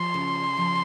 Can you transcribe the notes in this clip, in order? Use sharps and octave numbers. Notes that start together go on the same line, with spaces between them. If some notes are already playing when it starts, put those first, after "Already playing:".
Already playing: F3 C6
C#3
F3